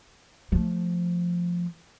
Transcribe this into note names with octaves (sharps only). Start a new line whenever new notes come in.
F3 A3